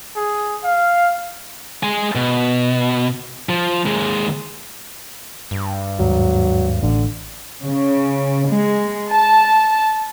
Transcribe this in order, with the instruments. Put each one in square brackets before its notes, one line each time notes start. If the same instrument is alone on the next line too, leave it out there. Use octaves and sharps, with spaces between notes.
[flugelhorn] G#4
F5
[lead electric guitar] G#3 G#5
B2
F3
D#2 G#3
[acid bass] G2
[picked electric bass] D#2 G#2 [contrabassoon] F#3
[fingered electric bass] A1 [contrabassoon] D3
[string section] C#3
G#3
A5